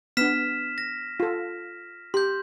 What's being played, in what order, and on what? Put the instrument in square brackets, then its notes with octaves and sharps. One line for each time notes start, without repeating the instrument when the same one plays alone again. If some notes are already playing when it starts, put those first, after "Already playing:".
[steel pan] B3 D4 [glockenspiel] F6 B6 E7
[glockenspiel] A#6
[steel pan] F4 A4
[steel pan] G4 [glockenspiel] C6 G6